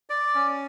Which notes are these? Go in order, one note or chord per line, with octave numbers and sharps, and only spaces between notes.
D5
C#4